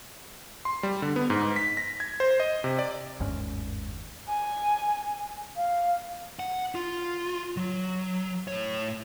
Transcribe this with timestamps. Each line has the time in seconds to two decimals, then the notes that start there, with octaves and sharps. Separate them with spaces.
0.65 C6
0.83 G3
1.02 D3
1.16 B3
1.30 G#2
1.56 B6
1.77 A#6
2.00 G#6
2.20 C5
2.40 D#5
2.64 C3
2.79 D5
3.20 G1 D#2 G#2 C#4
4.28 G#5
5.56 F5
6.39 F#5
6.75 F4
7.57 F#3
8.48 A2 C#5